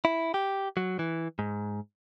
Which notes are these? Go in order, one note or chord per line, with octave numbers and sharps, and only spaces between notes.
E4
G4
F#3
E3
G#2